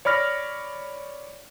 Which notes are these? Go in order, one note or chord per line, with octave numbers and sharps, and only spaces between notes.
C#5 D5 B5 F6 A#6